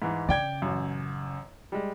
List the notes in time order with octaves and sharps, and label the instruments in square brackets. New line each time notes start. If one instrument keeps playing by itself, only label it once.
[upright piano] G#2 E3
[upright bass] C#3 [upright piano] D5 G5 G#6
[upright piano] A1 F#2
G3 G#3